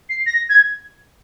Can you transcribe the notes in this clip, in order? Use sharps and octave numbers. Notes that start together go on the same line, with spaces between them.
C7
A#6
G#6